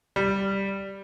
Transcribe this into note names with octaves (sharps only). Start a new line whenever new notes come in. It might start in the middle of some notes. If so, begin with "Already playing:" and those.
G3